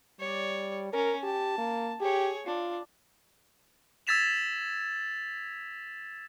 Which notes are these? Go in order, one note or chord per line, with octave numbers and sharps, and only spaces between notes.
G3 C#5 D5
C#4 A#4
G4 A5
A#3
G4 G#4 C#5
D4 F4
E6 G#6 A6 B6 E7 F7